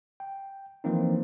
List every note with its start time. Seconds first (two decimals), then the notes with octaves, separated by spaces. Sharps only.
0.20 G5
0.84 E3 F3 A#3 C4 D#4